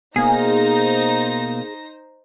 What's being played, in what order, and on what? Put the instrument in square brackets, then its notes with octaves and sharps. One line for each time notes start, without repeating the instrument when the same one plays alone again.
[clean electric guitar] B2 A#3 [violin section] D#4 C5 A#6 [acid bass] G#4